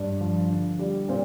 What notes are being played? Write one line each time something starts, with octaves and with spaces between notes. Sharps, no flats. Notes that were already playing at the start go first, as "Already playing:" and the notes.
Already playing: G2 D4
F3
D3
G3
A#2 C4 C5